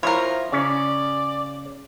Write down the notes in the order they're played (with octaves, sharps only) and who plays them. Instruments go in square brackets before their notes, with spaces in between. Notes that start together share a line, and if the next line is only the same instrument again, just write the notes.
[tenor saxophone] F3 [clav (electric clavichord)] E4 [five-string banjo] A#4 C#5
[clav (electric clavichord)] C#3 C#4 [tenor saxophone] D5